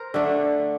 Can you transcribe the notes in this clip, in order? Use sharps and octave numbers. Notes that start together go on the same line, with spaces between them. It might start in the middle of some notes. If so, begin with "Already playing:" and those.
Already playing: A#4 C5
D3 A3 D4